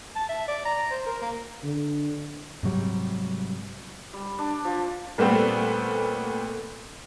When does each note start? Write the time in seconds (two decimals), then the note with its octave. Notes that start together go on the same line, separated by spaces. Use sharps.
0.16 A5
0.29 E5
0.48 D5
0.65 A#5
0.91 C5
1.06 A#4
1.22 A#3
1.64 D3
2.63 G#2 C3 F#3 G3
4.13 G3
4.38 D4
4.65 F3
5.18 A#2 G3 A3 B3 C4